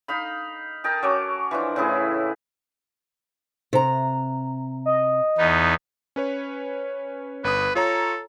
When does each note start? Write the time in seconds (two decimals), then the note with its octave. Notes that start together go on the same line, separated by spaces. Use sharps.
0.08 D#4 F5 B5
0.84 A#4 D#5 G5 A5
1.03 F#3 C#4 D6
1.51 E3 F3 D4
1.76 A2 C#3 E4 G#4
3.73 C3 A#5
4.86 D#5
5.38 E2 B3 D#4
6.16 C#4 B4 C#5
7.44 G1 B4 D#6
7.75 F4 A4 C#5 A#5